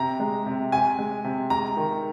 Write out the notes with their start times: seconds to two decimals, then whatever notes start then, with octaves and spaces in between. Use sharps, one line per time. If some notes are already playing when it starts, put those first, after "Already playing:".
Already playing: C3 A#5
0.20 G#3
0.46 C3
0.72 C3 G#5
0.99 G#3
1.24 C3
1.50 G#3 A#5
1.77 D#3